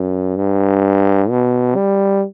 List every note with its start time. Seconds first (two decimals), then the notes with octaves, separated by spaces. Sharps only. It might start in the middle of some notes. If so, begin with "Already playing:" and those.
Already playing: F#2
0.36 G2
1.29 B2
1.76 G3